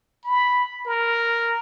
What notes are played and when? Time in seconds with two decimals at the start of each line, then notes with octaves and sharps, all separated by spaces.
0.24 B5
0.86 A#4